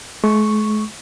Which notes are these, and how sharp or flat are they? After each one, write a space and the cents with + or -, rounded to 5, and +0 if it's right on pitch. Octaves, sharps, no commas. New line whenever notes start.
G#3 +45 C#6 +0